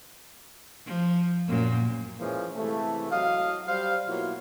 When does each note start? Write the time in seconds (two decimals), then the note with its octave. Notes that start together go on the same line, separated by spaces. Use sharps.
0.86 F3
1.48 F#2 A#2
2.19 E3 F3 G#3 A#3 C#4
2.56 C3 E3 G#3 A3
3.11 F#3 D#5 F5
3.67 G3 C5 F5
4.08 B2 F#3 A#3 E4 F4